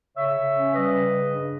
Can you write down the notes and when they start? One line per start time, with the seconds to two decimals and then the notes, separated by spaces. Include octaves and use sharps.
0.17 C#3 C#5 E5
0.36 C#3
0.56 C#4
0.74 G3 B4 D#5
0.93 C#3
1.12 C#3
1.31 G2